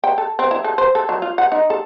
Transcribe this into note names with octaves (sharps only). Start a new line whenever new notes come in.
G5
A4
C4
E4
A4
C5
A4
F#3
F4
F#5
D#4
A4